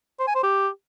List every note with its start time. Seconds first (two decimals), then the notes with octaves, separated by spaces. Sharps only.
0.20 C5
0.27 G#5
0.35 C5
0.43 G4